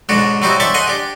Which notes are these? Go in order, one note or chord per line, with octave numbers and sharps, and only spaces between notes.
B1 G#2 B2 D4 F#4
F#3 G3 C4 D#4 E4 F#4
D4 C5 C#5 E5 A5 B5
C5 D#5 F#5 G#5
D4 G4